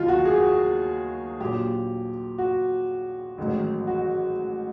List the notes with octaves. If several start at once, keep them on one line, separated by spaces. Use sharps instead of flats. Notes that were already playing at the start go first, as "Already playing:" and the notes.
Already playing: D#2 D#3 F#3 F4
F#4
G#4
F#4
A#1 A#2 F#3 G4
F#4
A1 G#2 D#3 F#3
F#4